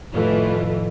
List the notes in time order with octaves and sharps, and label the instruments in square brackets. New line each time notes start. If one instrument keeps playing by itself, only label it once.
[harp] F2 A2 D#3 [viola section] E3 A3 F4